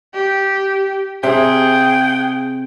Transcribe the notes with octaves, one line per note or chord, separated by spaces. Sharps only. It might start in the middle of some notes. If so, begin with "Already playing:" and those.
G4
C3 G#4 G5